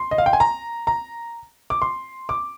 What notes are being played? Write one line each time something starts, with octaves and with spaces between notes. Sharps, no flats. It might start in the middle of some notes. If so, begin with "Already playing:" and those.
Already playing: C6
D#5
F5
G5
G#5
A#5
A#5
D6
C6
D6